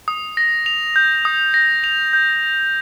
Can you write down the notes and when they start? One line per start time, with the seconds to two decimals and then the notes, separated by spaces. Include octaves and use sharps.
0.08 D#6
0.37 A#6
0.66 F7
0.96 G6
1.25 D#6
1.54 A#6
1.84 F7
2.13 G6